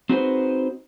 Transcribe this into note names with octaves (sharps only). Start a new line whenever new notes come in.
C4 D#4 F#4 G#4 B4 C5